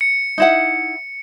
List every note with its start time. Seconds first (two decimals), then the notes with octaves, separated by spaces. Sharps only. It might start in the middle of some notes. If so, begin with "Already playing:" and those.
0.01 C#7
0.38 D#4 E4 F#5